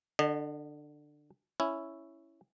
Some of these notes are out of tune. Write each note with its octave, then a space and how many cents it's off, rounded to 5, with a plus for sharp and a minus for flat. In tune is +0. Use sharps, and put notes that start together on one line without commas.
D3 +15 D#5 -35
C#4 +0 E4 +0